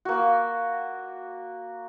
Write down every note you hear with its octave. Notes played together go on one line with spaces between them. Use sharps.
A#3 F#4